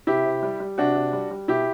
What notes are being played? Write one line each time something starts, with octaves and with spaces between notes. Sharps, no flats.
C3 E4 G4
C3
G3
G3
C3 D4 F#4
C3
G3
G3
B2 E4 G4